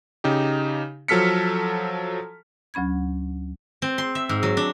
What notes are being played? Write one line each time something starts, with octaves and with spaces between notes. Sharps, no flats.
C#3 D#4 G4
F3 F#3 A4 F6 B6 C#7
D2 F#3 C#4 B5 G#6
C4
C6
E5
G#2
F#3
D4